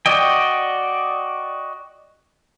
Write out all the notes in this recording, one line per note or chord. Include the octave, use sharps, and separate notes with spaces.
F#4 D5 D#5 G5